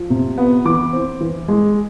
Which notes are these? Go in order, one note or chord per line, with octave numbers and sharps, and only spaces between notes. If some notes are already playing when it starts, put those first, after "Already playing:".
Already playing: F3
C3
B3
E3 D6
C4
E3
G#3